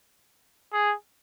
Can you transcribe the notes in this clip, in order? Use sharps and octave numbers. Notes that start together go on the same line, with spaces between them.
G#4